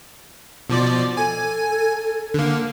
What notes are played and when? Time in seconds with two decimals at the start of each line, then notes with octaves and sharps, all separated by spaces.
0.70 B2 F3 D5
1.17 A4 G#5
2.34 D3 A#3